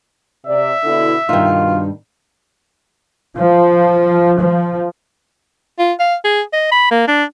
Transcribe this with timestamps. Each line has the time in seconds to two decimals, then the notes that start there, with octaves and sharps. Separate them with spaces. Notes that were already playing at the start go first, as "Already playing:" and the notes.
0.47 C3 D5 E5
0.84 B2 D3 E4
1.29 G2 B2 D#3 D#4 F4
3.37 F3
4.39 F3
5.79 F4
6.00 F5
6.25 G#4
6.53 D#5
6.71 B5
6.91 A#3
7.08 D4